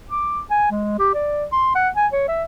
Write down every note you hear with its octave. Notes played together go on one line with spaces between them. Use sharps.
D6
G#5
G#3
G4
D5
C6
F#5
G#5
C#5
E5